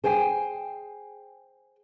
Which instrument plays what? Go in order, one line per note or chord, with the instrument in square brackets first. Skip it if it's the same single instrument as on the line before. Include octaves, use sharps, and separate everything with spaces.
[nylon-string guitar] G#4 C5 G5 G#5